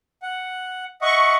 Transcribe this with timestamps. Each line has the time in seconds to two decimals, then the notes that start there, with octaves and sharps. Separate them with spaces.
0.22 F#5
1.01 D#5 E5 F#5 C#6